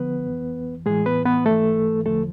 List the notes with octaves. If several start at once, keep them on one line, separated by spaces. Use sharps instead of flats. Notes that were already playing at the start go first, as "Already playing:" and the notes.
Already playing: D3 F3 B3 B4
F2 E3
A2 E3 G#3 G#4
B3 B4
B3 B4
G#2 E3 A3 A4
E2 D3 F3 A3 A4